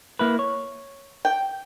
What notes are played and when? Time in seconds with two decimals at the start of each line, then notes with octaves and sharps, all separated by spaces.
0.19 A#3 E4 B4
0.39 C#5
1.25 G5